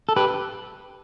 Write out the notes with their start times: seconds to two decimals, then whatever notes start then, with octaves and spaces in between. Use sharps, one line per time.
0.09 A4
0.16 G4 B4